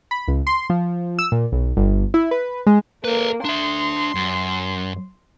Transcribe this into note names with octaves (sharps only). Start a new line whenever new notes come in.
B5
C#2
C6
F3
E6
A#2
B1
G1
E4
B4
G#3
A#3 A4 B4
D4 E5 C6
F#2